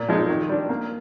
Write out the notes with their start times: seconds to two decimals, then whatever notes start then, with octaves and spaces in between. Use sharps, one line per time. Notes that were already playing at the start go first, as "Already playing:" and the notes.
Already playing: A#2
0.09 F3 G#3 D#4
0.29 D#3
0.49 G3 D4
0.69 A#3